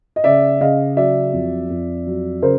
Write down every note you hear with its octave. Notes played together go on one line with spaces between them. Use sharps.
D#5
C#3 D5 E5
C#3 D#5 F5
F#3 D5 E5
F2
F2
F#3
C#3 A#4 C5